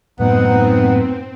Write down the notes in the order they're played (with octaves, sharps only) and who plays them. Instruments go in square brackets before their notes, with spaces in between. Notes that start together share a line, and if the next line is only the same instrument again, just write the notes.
[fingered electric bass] F#2 A2 [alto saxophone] B3 [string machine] C4 [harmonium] D#4 F#5